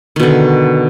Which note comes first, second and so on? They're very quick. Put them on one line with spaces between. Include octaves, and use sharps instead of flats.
D#3 B2 D3